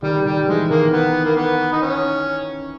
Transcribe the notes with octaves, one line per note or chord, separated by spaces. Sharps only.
D#3 G3
D#3 G3
E3 G#3
D#3 A#3
B3
A#3
B3
D#4
C#4